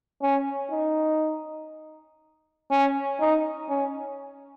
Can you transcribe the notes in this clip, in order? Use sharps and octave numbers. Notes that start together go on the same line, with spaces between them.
C#4
D#4
C#4
D#4
C#4